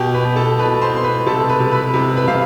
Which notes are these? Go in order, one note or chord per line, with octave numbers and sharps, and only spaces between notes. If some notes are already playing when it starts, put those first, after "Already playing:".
Already playing: B2 G4 G5
B4 B5
B2
A4 A5
B2 B4 B5
C5 C6
B2 C6
B4 B5
C3 A4 A5
B4 B5
C3
B4 B5
C3
B4 B5
C3 F5